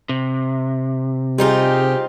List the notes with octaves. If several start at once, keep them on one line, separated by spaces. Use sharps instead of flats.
C3
G3 C4 D#4 F4 G4 G#4